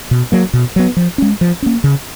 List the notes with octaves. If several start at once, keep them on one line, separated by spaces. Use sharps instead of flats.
B2
F#3 A#3
B2
F#3 B3
F3
G#3 C#4
F3
A#3 C#4
C#3